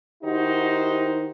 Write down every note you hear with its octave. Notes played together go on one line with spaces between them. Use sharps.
D#3 D#4 E4 F#4 G4 C5